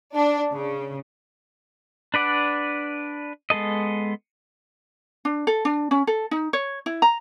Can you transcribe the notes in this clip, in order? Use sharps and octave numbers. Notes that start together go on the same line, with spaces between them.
D4
C#3
D4 B4 D5 F#5
G#3 B3 A4 D#5
D4
A4
D4
C#4
A4
D#4
C#5
E4
A#5